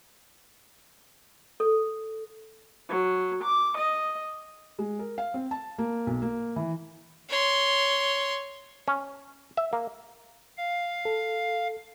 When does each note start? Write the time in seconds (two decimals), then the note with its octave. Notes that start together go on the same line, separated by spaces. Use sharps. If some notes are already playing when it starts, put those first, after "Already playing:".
1.60 A4
2.89 F#3
3.44 D6
3.78 D#5
4.79 G#3
4.99 A#4
5.18 F5
5.34 C4
5.51 A5
5.78 A#3
6.07 B1
6.22 A#3
6.56 E3
7.29 C#5 C6
8.88 C#4
9.57 E5
9.73 A#3
10.57 F5
11.05 A4